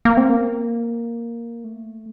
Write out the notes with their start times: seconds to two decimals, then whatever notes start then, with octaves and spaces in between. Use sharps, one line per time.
0.05 A#3
0.17 C4
0.30 A#3
1.64 A3